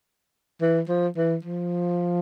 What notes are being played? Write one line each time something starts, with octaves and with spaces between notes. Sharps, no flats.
E3
F3
E3
F3